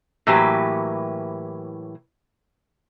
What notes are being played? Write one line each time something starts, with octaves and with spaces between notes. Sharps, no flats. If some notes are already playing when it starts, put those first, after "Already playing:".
A2 E3 F#3 A#3 G4 B4